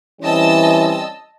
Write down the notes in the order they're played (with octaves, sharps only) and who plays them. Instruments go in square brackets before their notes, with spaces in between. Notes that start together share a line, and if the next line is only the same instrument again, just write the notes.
[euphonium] E3 [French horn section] G3 C4 C#4 [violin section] D#5 A5 E6